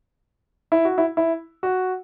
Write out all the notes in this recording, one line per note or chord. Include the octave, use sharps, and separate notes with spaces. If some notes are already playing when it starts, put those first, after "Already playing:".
E4
F#4
E4
E4
F#4